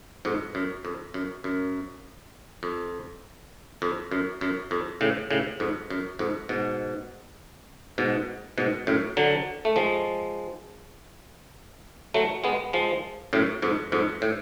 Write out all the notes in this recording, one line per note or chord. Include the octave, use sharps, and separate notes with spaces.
F2 G#2
F#2
F2
F#2
F#2
F2
F2
F#2
F#2
F2
A2 C#3
A2 C#3
F2 G#2
F#2
F2 G#2
G#2 B2
G#2 B2
G#2 B2
F#2 A2
D3 F#3
A3
F3 G#3
F#3 A3
G#3 B3
F3 G#3
F#2 A2
F2 G#2
F2 G#2
A2